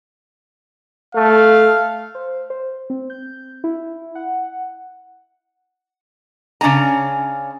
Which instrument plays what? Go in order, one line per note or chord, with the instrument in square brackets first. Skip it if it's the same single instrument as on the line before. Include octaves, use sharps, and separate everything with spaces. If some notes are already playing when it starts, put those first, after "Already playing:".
[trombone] A3 [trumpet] F5
[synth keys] C5
C5
C4
G6
E4
F#5
[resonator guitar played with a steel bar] C#3 C#4 D4 G#5 A#5